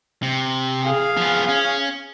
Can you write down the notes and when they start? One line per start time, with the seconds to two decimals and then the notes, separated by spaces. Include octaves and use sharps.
0.23 C3
0.83 G#4 F5
1.17 F3 B3
1.49 C#4